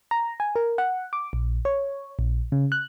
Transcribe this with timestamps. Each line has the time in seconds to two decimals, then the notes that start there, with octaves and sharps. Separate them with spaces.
0.11 A#5
0.40 G#5
0.56 A#4
0.78 F#5
1.13 D6
1.33 A#1
1.65 C#5
2.19 A#1
2.52 C#3
2.72 F#6